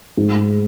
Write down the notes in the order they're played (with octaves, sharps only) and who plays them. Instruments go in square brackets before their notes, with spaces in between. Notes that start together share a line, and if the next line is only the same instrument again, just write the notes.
[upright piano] G#2